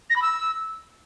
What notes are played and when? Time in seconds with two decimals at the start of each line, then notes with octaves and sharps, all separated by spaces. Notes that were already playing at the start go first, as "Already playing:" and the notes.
0.10 A#6
0.16 B5
0.22 E6